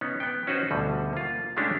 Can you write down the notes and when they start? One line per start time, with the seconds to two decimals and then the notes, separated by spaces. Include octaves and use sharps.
0.01 B3 C#4 D#4
0.20 B3 G5
0.47 C#4 D#4 F#4 B4 C5
0.71 D2 B2 D3 G3
1.13 A#3 F4
1.57 G#3 A3 C#4 D4 E4 G4